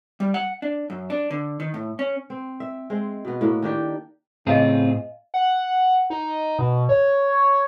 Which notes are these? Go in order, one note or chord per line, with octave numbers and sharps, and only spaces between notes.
G3
F#5
D4
F#2
D4
D3
D#3
A2
C#4
C4
E5
G#3 C4
B2 B3
A2 A#3 F#4
D#3 D4 G4
A2 C#3 C4 F4 G#4 D#5 F5 G#5
F#5
D#4
B2
C#5